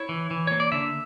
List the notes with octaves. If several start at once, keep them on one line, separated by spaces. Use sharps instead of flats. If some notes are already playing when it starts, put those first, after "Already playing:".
Already playing: E4 C#5
E3
E3
A#3 C#5
D5
D3 E5